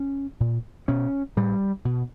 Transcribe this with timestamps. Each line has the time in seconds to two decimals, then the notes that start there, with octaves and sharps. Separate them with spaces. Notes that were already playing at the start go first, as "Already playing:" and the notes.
Already playing: C#4
0.40 A#2
0.88 B2 C#4
1.36 A2 G3
1.85 B2